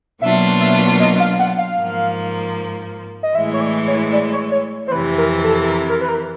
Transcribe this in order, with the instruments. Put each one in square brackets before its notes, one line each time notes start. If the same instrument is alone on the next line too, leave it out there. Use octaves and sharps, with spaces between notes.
[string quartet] B2 F#3 A#3 D4 F4 [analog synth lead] E5
[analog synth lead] E5
D#5
F5
F#5
F5
[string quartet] G#2 F3 A#3
[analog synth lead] D#5
[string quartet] A2 E3 G#3 [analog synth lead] E5
[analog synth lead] C#5
D5
C#5
D5
C#5
C#5
C5
[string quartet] F2 C3 E3 [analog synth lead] B4
[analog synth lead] A#4
A4
A4
A#4
A#4
B4
A#4